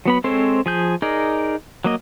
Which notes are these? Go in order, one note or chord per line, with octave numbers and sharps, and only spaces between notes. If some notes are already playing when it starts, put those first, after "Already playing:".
F#3 B3 B5
G#3 C4 A4 C5 C#5
F3 G#4 G6
D#4 G#4 A#4 D5
F#3 A#3 D#5